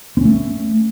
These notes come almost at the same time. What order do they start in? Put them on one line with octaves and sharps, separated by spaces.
C4 C#4 A3